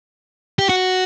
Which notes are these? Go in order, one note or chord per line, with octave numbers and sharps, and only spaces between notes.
G4
F#4